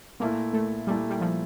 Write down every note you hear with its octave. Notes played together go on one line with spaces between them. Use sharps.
A#2 A3 A#3 E4
A3
A#2 G3 A3 E4
G3
F3